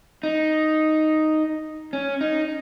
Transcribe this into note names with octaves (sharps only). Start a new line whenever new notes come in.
D#4
C#4
D#4